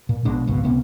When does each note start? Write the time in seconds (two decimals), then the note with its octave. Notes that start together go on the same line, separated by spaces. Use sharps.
0.09 A#2
0.25 A#1 B2 G#3 D4
0.47 G#1 C#2 B2
0.64 C#2 C3 B3 C#4